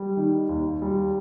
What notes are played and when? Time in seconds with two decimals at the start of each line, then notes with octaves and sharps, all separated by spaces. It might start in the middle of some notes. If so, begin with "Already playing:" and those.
Already playing: G3
0.17 D#3
0.49 D#2
0.82 G3